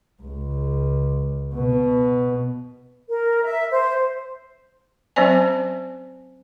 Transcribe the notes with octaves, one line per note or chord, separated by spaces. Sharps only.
C#2
B2
A#4
E5
C5
F#3 C4 C#4 C5 D5 G#5